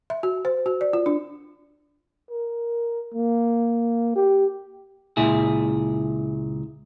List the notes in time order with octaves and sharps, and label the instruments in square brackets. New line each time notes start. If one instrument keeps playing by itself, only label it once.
[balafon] E5
F#4
C5
F#4
D5
F4
D4
[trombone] A#4
A#3
G4
[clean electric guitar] C#2 A#2 E4 G#4